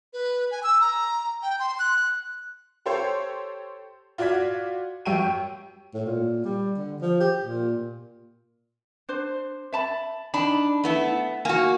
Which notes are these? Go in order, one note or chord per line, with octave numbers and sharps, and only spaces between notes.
B4
G#5
E6
A#5
G5
C6
F#6
G4 A4 C5 C#5
F4 F#4 D5 G#6 B6
F#2 G4 G5 C#6 D#7
A2
A#2
G3
D3
F3
G4
A#2
D4 C5
E5 A5 B5
D4 D#4 A5 B5
A3 B3 E4
A#3 F#4 G#5